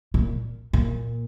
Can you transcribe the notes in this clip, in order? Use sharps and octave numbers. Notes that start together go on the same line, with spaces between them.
A#2
A#2